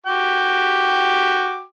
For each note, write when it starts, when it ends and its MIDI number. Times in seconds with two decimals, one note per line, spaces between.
0.06 1.62 66
0.06 1.62 79
0.06 1.62 86